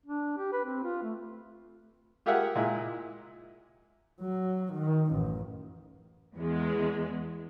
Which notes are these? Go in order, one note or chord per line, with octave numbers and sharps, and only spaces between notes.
D4
G4
B4
C4
F4
A3
F4 G4 G#4 A#4 E5 F#5
A#2 G#3 E4
F#3
D#3
A1 F#2
E2 G#3